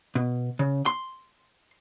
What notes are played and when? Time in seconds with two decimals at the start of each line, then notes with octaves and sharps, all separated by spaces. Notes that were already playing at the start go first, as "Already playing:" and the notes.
0.15 B2
0.59 C#3
0.86 C6